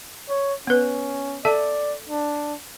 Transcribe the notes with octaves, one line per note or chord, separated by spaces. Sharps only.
C#5
B3 C#4 B4
A4 D5 E5 A5
D4